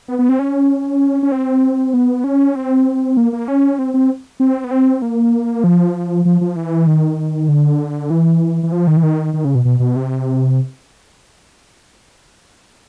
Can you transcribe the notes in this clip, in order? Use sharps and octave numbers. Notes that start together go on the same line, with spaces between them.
B3
B3
C4
C#4
C#4
C4
B3
C#4
C4
A#3
A#3
C#4
C4
C4
C4
B3
C4
A#3
F3
F3
F3
E3
D#3
D3
E3
E3
F3
D#3
E3
D#3
D#3
C#3
B2
B2
B2
C3